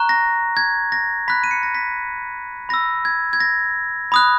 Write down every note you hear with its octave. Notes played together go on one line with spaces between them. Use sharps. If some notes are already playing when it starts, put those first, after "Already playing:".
Already playing: A#5 C#6 F#6
A#6
G#6
A#6
B5 F#6 B6
D#7
C#7
A#6
B6
B5 E6 A#6
G#6
G#6
A#6
B5 D#6 F#6